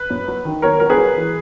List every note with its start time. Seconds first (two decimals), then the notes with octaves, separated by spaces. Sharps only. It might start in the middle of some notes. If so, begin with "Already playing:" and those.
Already playing: B4
0.10 F#2
0.28 F#3
0.45 D#3
0.62 F#3 A#4 C#5
0.80 F#3 A#4
0.90 G#4 B4
0.97 F#3
1.16 E3